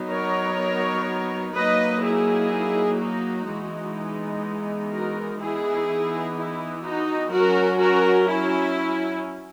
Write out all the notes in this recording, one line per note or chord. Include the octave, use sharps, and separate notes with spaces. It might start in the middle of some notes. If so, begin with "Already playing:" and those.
Already playing: F#3 B3 D#4
A#4 C#5
F#3 A#3 D#4 B4 D#5
E4 G#4
D#4 F#4
E3 G#3 B3 D#4
F#4 A#4
E3 B3 D#4 E4 G#4
E4
D#4 F#4
F#3 C#4 F#4 A#4
F#4 A#4
E4